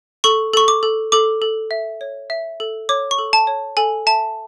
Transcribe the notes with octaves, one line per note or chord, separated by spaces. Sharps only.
A4 C#6
A4 C#6
D6
A4
A4 D6
A4
E5
C#5
E5
A4
C#5 D6
C#6
A4
A5
C#5
A4 G#5
E5 A5